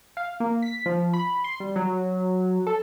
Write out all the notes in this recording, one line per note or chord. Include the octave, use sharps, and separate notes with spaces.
F5
A#3
B6
F3
B5
C6
G3
F#3
A4